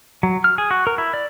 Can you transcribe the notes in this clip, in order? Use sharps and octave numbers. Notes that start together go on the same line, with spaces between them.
F#3
F6
G#4
F#4
A#4
E4
D5